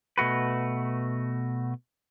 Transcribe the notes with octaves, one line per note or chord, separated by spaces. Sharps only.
B2 A3 F#4 B4